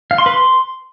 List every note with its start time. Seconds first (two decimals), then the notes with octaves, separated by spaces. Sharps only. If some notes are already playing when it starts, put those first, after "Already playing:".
0.11 F5
0.18 C6
0.26 B4
0.34 C6